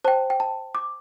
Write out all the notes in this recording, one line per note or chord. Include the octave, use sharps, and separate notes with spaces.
C5 G5 A5
G5
A5
D6